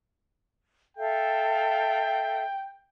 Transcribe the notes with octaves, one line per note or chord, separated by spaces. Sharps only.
A4 E5 F5 G5